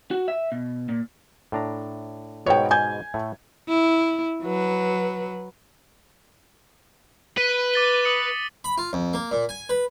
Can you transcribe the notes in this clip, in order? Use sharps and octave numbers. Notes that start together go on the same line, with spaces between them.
F#4
E5
B2
A#2
A2 D4 A#5
G#2 B2 B3 C#5 G5
G#5 G6 G#6
A2 A3
E4
F#3 B4
B4 B6 D#7 G7
D6 A6 G7
D#6 C#7 F#7
B5
F4
F2
A#3
A#2
G#5
B4